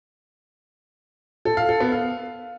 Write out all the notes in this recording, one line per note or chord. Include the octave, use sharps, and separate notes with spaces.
A4
F5
A4
B3
F5